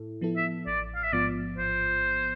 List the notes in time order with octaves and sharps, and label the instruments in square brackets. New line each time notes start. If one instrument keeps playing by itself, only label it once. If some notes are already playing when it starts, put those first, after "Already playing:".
Already playing: [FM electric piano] A2 E4 A4
F3 B3 E4 A4
[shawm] E5
[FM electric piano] A1 [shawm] D5
[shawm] F5
E5
[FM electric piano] G#2 F3 B3 F4 [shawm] D5
[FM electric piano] A1 [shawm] C5